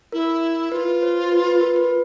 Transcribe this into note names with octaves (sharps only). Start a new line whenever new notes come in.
E4 A#4
F4 B4
C5
B4
B4
A#4
B4